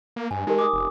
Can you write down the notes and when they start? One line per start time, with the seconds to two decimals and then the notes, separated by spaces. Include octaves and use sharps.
0.16 A#3
0.31 G2 G#5
0.47 G#3 D#4 G4 A#4
0.59 D6 D#6
0.73 F1